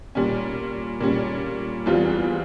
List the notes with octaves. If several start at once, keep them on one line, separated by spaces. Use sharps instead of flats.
A#2 G3 C#4
A#2 G3 C#4
E2 E3 G3 C4 F4